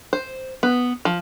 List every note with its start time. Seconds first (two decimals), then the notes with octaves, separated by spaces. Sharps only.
0.13 C5
0.63 B3
1.05 F3